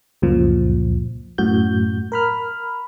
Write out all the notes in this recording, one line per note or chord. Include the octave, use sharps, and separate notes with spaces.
C#2 F#2 A#2 F3
F#2 A2 F#4 G6
A#4 B5 F6